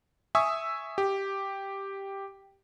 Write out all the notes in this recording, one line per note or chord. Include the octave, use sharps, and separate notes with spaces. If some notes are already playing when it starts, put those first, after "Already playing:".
E5 G#5 C#6 D#6 E6
G4